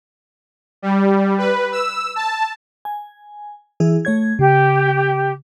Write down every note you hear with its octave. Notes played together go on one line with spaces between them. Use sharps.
G3
B4
E6
A5
G#5
E3 E4 G#4
A3 C#5 G#6
C#3 G4